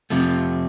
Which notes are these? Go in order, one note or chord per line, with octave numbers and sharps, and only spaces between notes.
F2 C3 F3 A3